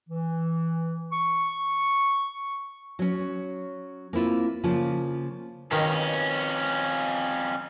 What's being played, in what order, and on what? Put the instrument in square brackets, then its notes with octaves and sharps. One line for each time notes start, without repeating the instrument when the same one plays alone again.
[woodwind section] E3
C#6
[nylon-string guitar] F#3 C#4
A#3 C4 E4 F4
C#3 F3 A#3 F4
[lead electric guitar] F2 C#4 [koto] B2 D#3